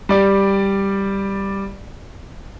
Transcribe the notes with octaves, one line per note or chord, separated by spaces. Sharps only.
G3 D5